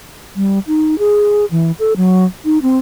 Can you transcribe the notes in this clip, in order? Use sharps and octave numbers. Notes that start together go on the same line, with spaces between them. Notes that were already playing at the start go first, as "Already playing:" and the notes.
G3
D#4
G#4
E3
A4
F#3
D#4
C4